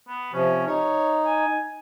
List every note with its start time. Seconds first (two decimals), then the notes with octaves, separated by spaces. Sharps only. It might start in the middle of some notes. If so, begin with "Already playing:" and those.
0.08 B3
0.33 C3 F3 C#4
0.67 D#4 C#5
1.25 G#5